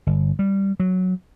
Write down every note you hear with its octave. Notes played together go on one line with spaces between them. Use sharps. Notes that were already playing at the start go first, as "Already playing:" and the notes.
G1
G3
F#3